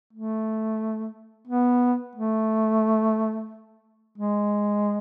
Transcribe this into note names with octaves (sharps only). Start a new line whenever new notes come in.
A3
B3
A3
G#3